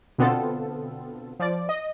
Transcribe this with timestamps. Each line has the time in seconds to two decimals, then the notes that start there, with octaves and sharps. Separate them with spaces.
0.18 B2 D3 B3 C4 F4 A4
1.39 F3 D5
1.69 D#5